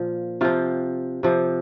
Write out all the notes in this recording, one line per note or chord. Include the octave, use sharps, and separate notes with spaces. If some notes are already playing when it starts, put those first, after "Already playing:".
Already playing: A#2 F3
C3 F3 F4
C3 F3